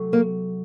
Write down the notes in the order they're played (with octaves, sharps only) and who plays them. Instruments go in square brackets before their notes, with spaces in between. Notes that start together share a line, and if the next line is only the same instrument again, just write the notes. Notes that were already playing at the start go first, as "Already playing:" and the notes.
Already playing: [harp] C3 F#3 A3
[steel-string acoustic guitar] A#3